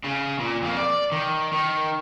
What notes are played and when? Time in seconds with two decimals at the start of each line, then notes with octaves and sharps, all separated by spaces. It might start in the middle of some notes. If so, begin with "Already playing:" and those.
0.04 C#3
0.39 A#2
0.62 F2 A#3
0.77 D5
1.12 D#3
1.52 D#3